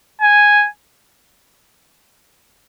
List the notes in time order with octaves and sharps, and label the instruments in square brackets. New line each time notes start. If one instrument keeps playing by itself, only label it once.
[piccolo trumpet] G#5